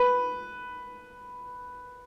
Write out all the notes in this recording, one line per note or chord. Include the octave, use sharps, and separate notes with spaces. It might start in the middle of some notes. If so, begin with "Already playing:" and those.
Already playing: B4